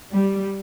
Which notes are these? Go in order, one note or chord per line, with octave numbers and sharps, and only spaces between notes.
G3